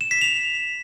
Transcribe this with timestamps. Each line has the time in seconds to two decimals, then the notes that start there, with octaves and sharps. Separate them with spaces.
0.01 E7
0.11 B6
0.21 F7